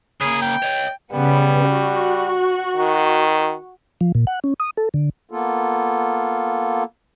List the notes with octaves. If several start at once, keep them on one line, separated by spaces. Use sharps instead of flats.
C#3 A#3 G#4
G5
C#5 D#5
C#3 G3 B3
F#4
D#3
F3
A#2
F#5
C#4
D#6
A4
D3
A#3 B3 F4 A4